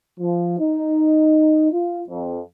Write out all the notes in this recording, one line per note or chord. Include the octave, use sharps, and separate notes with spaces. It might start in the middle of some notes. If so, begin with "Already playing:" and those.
F3
D#4
F4
F2